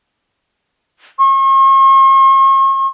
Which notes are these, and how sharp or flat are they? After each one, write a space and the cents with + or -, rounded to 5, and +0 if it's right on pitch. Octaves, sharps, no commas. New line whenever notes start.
C#6 -45